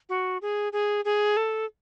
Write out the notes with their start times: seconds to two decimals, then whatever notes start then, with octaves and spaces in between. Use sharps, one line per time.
0.09 F#4
0.42 G#4
0.73 G#4
1.05 G#4
1.37 A4